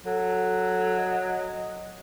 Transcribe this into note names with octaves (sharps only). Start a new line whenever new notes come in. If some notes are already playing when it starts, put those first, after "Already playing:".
F#3 A4
D#5